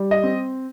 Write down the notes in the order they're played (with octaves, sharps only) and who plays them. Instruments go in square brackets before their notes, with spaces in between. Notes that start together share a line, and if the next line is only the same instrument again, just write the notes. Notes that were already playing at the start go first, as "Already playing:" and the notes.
Already playing: [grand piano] G3
D#5
C4